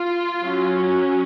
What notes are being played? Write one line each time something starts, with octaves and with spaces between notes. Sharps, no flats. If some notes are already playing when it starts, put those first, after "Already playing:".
Already playing: F4
F#3 C#4